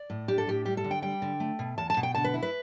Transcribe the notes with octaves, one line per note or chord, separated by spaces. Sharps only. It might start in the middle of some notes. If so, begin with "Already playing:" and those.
Already playing: D5
A2
D4 G4
A4
A2 G4
G3 G4
A4
D3
G5
G3 G5
D3
A3
B2
E2 A5
A5
B2
G5
D3 A5
B4
E4
B4